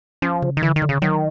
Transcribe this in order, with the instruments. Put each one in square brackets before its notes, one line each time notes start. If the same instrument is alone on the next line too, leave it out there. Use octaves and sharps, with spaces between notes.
[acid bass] F3 [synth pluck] C#4
[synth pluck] C#3
[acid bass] D#3
[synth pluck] D3 [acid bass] E3
[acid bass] D#3
[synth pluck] D3
[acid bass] C#3
[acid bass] D#3 [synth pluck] F#3